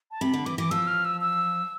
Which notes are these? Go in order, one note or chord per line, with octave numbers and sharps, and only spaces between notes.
A5
C3 B5
D3
E3 D6
E3 D6
F3 E6
F6
E6
E6